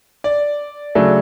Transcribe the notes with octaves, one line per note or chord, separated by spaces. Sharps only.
D5
C#3 F#3 A3 D4